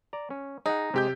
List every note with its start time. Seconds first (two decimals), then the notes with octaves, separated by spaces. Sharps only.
0.13 D5 A#5
0.30 C#4
0.66 D#4 G#4 F#5
0.94 C3 G#3 G4 G6